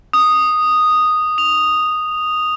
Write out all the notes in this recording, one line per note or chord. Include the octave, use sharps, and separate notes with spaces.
D#6
F7